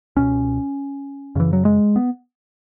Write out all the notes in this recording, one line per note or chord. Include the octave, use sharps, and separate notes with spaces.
C#2 B2 C#4
F#2 C#3 E3
F#3
G#3
B3